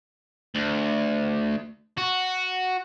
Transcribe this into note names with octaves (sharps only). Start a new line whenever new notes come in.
D2
F#4